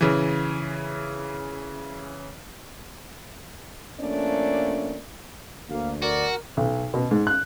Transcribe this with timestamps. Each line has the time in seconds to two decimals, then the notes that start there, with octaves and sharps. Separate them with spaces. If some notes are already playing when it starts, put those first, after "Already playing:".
0.01 C#3 E3
4.00 F3 A3 A#3 C#4 D4 D5
5.70 D2 A#3 F5
6.02 F#4 A#4 D5
6.57 B1
6.94 B2
7.11 G#2
7.27 F#6